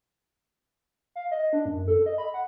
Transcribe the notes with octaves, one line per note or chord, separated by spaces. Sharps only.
F5
D#5
D4
F#2
A4
D#5
B5
F#5